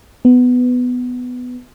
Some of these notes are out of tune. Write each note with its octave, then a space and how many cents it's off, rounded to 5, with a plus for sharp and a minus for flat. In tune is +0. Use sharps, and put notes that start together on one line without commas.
B3 +10